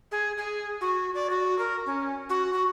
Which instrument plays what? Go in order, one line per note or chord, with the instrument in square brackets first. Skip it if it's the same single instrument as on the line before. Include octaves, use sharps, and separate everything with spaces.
[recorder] G#4
G#4
F#4
D5
F#4
A#4
C#4
F#4
F#4